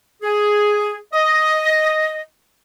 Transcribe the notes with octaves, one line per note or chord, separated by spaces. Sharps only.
G#4
D#5